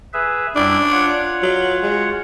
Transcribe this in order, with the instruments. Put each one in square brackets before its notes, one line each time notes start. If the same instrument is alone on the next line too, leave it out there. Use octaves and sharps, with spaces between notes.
[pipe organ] G#4 B4 E5
[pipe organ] F#2 G3 E4 [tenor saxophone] D4
[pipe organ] F4 C#5 F#5
[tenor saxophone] F#3
G#3